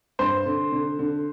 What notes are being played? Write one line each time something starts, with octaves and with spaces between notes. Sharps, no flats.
G2 C5 C6
D3
D3
D3